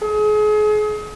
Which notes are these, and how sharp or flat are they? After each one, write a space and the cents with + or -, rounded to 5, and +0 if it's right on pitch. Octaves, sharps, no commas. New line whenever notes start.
G#4 +35